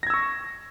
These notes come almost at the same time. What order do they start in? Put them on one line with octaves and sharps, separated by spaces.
A#6 G#6 E6 C#6